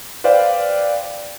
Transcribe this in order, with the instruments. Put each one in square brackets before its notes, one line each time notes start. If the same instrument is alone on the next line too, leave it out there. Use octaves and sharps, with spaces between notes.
[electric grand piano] B4 C5 D5 F5 G5